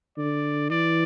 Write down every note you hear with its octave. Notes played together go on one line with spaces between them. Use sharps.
D3 D5
E3 D5